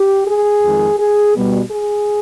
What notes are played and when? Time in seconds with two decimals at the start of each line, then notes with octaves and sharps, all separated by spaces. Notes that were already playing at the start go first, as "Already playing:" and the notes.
Already playing: G4
0.27 G#4
0.62 F2 D#3 G#3
0.98 G#4
1.35 B2 G3
1.71 G#4